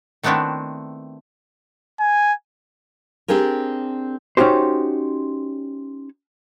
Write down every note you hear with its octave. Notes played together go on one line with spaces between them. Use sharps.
D#3 A3 B3 C4 D4 E4
G#5
C4 D4 G4 G#4 A#4
C#4 D#4 F#4 G4 C5